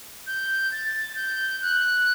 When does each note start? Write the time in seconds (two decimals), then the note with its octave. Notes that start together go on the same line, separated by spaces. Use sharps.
0.27 G6
0.72 A6
1.16 G6
1.62 F#6